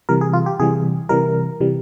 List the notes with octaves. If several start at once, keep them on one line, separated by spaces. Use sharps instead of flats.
C3 E3 G3 A#4
G#4
F4
G4
C3 E3 G3 G#4
C3 E3 G3 A#4
C3 E3 G3